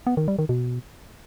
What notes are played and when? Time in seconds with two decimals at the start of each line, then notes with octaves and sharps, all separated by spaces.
0.07 B3
0.17 D#3
0.28 G3
0.39 D#3
0.49 B2